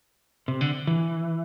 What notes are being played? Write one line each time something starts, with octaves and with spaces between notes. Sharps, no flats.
C3
D3
E3